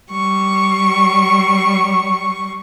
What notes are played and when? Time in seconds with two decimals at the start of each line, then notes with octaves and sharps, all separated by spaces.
0.10 G3 C#6